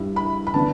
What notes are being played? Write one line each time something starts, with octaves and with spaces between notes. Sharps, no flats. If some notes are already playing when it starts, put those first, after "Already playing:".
Already playing: G2 G3 E4
B5
B5
D3 B3 D4 A5